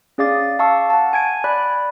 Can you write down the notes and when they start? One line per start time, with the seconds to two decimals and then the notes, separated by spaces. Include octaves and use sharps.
0.18 C#4 G#4 D5 F5 D6 A6
0.59 F5 A5 C#6 E6
0.90 F#5 A5
1.13 G#5 G#6 D7
1.44 D5 B5 F#6